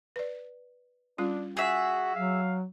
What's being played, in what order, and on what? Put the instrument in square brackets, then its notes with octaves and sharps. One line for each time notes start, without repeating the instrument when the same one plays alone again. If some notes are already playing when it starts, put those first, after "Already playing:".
[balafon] B4 D5
[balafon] G3 C#4 F4 [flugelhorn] D4
[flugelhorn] F#4 [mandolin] G#4 E5
[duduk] F#3 [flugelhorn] F5